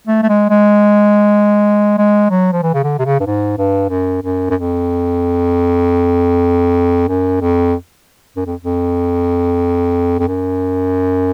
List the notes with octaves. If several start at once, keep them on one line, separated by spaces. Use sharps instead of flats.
A3
A3
G#3
G#3
G#3
F#3
F3
E3
C#3
D3
C3
C#3
G2
G#2
G2
F#2
F#2
F#2
F2
F#2
F2
F#2
F2
F2
F2
F#2